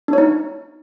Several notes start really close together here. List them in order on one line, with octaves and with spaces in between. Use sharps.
D4 C#5 D#4